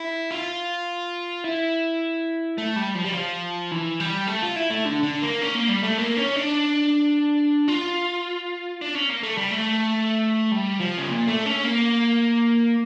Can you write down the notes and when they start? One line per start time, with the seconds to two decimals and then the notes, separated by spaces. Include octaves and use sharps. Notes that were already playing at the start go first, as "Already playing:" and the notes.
Already playing: E4
0.31 F4
1.44 E4
2.58 A3
2.76 G3
2.95 F3
3.05 G3
3.12 F3
3.71 E3
4.00 G3
4.27 A3
4.42 F4
4.56 E4
4.70 A3
4.85 D3
5.03 D3
5.22 A#3
5.42 C#4
5.55 A#3
5.69 G3
5.83 A3
5.98 A#3
6.17 C#4
6.36 D4
7.68 F4
8.82 D4
8.95 C#4
9.10 A#3
9.23 A3
9.38 G3
9.51 A3
10.51 G3
10.80 F3
10.98 C#3
11.08 A#2
11.27 A3
11.46 C#4
11.64 A#3